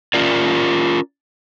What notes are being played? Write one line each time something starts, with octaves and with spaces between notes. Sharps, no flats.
C#4 F4 A#4 D5